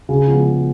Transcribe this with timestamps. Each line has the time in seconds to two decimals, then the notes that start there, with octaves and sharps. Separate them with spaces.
0.09 C#3
0.27 F3 G#3 B3
0.45 C#3